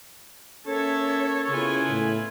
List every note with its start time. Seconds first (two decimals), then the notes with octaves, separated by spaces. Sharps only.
0.67 A#3 C#4 A4 C#5 E5 A5
1.49 C#3 B3 E4 F4 G#5
1.90 A2